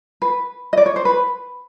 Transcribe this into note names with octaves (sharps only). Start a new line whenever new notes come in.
B4
D#5
D5
C#5
C5
B4